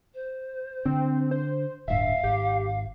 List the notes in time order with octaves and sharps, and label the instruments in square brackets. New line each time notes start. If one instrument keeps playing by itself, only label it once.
[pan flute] C5
[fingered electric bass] D3 [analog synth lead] C4
[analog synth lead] C5
[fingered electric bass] D1 G2 [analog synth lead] E5 [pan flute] F5
[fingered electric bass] G#1 [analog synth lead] G4